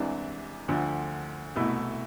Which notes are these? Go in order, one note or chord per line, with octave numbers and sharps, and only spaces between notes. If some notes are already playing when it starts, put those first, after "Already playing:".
Already playing: C2 C3 E3 G#3 D4
D2 D3 F3
C2 B2 A3 E4